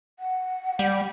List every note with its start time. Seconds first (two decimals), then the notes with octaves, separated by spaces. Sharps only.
0.19 F#5
0.79 G3